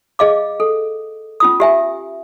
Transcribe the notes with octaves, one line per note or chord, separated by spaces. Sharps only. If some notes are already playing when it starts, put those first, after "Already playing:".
G#4 D#5 F5 D6
A4
C#4 F4 D#6
G4 E5 G#5